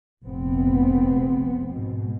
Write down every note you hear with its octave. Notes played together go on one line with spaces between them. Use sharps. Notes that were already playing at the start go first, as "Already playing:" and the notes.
F1 A#1 B3 C4
G#2 B2